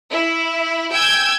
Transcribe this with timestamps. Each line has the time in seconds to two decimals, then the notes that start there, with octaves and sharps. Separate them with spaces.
0.11 E4
0.91 G5 G#5 E6 G6 G#6